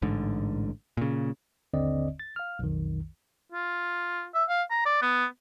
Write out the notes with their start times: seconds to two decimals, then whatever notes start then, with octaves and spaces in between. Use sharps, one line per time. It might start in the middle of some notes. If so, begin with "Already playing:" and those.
0.02 A1 G#2 D3
0.97 A#2 C#3
1.73 G1 D#2 D3 C4 D5 D#5
2.20 A6
2.36 F5 F6
2.59 B1 F2 D#3
3.52 F4
4.35 E5
4.49 F5
4.71 A#5
4.86 D5
5.02 B3